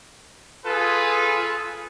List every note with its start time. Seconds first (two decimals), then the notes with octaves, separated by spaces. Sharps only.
0.65 F4 G#4 A4 B4